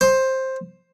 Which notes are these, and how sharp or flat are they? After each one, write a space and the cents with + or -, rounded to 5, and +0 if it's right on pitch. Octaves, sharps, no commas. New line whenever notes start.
C5 +10